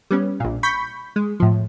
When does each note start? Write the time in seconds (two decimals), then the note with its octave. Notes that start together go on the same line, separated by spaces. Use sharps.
0.11 G3 B3 C#4
0.40 A#1 A#2
0.63 B5 C#6 G6 B6
1.16 G#3
1.40 A2 F3